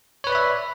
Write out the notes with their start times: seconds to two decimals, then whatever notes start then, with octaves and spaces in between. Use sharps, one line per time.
0.24 C#5
0.27 B4
0.30 D5
0.32 B5
0.35 E5